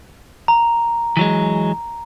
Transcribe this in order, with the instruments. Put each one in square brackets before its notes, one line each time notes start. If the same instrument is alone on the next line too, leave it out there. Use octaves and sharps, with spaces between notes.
[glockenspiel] A#5
[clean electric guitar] E3 F#3 G#3